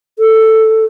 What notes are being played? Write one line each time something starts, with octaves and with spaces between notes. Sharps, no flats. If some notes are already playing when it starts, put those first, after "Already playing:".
A4